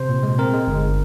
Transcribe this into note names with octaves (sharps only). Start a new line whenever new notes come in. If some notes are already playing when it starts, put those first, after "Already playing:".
Already playing: C3 C5
A#2
G#3
C4 A#4
G#3
G1